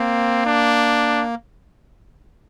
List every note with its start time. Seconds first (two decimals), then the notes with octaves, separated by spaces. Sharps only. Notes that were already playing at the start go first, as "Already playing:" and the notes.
Already playing: A#3 C4
0.46 D4